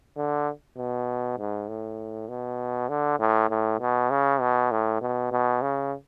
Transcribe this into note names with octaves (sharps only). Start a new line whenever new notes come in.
D3
B2
G#2
A2
B2
D3
A2
A2
B2
C#3
B2
A2
B2
B2
C#3